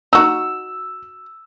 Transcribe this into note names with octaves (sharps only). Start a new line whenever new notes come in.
D#4 F#4 E6